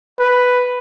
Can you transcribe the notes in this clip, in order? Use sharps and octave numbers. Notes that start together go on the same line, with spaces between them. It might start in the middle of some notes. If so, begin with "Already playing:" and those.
B4